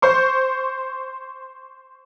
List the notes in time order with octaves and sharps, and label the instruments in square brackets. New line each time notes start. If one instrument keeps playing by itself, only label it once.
[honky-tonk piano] C5 C6 C#6